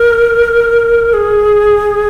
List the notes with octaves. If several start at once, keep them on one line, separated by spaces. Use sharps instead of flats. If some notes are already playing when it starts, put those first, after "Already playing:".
Already playing: A#4
G#4